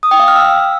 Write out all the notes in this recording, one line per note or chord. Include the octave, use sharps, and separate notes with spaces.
D#6
G5
F5
F6
E6